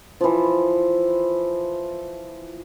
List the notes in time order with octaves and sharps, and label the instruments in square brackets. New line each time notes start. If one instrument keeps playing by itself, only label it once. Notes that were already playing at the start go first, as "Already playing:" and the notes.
[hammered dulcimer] E3 F3